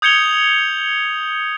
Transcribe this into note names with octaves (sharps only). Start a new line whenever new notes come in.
D#6 G6 G#6 C#7 F7 G7